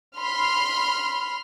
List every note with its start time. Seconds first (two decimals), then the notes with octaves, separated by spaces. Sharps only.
0.17 B5 C6 F6